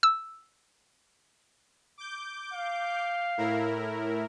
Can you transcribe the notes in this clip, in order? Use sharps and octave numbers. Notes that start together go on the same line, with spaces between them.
E6
D6 G6
F5
A2 E4 A#4